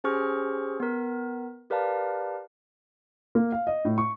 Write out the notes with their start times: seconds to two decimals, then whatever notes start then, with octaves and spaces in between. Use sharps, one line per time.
0.04 C#4 G4 G#4 C5 C#6 F6
0.80 B3 A#4
1.70 G4 A#4 B4 D5 F5 A5
3.35 A#3
3.52 F5
3.67 D#5
3.85 A2
3.98 C#6